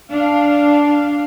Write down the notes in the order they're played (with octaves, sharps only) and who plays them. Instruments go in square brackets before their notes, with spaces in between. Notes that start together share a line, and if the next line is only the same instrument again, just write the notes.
[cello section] D4 F5